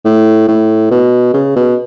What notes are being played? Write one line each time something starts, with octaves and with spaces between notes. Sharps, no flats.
A2
A2
B2
C#3
B2